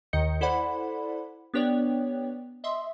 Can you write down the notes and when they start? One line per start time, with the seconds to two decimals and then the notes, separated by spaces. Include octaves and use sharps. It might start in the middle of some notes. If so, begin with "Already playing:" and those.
0.13 D#2 D#3 D#5 G6 C#7
0.41 E4 A4 C5 D5 F#5 B5
1.54 B3 D4 G4 C#5 D5 G5
2.64 D#5 E5 C6